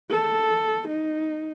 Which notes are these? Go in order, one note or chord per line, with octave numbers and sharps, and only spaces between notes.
A4
D#4